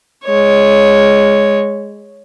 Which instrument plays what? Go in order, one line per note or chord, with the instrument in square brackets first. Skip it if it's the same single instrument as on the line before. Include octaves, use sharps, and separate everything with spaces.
[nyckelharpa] G#3 C#5